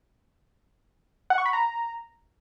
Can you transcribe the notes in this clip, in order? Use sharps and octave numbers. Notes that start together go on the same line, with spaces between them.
F#5
C#6
B5
A#5